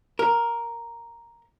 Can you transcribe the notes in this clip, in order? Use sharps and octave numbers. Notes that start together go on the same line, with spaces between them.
A#4